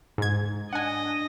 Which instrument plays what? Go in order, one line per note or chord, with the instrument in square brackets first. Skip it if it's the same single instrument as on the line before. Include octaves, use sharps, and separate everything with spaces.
[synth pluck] G#2 G#6
[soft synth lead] D4 [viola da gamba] D#5 [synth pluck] F#5 G#5